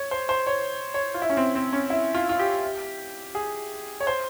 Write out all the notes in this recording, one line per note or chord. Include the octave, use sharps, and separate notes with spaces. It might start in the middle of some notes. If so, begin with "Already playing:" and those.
Already playing: C#5
C5
C5
C#5
C#5
F4
E4
C#4
C4
C4
C#4
E4
F4
F4
G4
G#4
C#5
C5